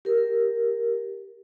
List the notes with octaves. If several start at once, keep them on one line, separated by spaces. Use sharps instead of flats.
G4 A#4